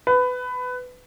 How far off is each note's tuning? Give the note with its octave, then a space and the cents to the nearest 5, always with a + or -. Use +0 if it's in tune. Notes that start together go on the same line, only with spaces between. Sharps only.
B4 +20